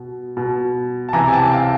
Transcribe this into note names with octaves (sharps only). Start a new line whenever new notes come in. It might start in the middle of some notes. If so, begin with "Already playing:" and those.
Already playing: B2
B2
A5
C3 E3 G#5 A#5
G#5
G5 A5
F5 G5